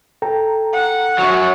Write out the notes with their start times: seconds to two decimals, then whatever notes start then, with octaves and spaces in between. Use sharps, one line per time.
0.22 A4 G5 A#5
0.73 F#5
1.19 F#2 F#3